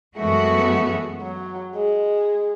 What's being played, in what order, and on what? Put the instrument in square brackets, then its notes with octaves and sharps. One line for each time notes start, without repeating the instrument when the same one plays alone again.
[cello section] F#2 E3 G#3 B3 F#4 [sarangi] A3
[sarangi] F#3
G#3